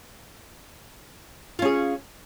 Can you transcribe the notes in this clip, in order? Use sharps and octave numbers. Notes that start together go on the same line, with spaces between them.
C#4 F4 G#4